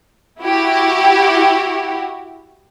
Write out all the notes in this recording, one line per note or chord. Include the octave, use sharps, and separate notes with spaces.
E4 F#4 G4